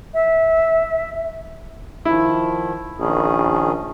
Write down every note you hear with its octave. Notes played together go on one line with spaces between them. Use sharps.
E5
D#3 F3 E4
A#1 D#3 C#4 G#4